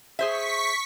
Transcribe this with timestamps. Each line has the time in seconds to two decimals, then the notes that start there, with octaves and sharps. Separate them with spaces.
0.19 G#4 C5 E5 C#6 B6